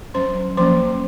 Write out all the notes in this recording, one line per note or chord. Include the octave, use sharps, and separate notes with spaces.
F#3 C#4 C5 C6
F3 A#3 C#4 C5 C6